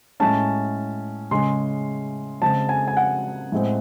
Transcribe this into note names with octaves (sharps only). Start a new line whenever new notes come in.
A2 G#3 C#4 A5
C#3 G#3 C#4 C6
C#3 G#3 C4 A5
G#5
G#5
F#5
A2 G#3 C4